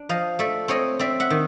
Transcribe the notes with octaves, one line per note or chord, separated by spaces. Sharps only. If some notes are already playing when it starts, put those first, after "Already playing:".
Already playing: D4
F3 D#5 F5
A3 D5 E5
C4 C#5 D#5
C4 D5 E5
E5 F#5
D#3